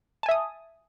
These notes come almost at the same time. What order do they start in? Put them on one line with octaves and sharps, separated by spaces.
A5 G#5 E5 D#6